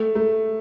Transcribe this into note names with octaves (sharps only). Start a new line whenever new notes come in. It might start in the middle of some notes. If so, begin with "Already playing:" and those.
Already playing: A3
A3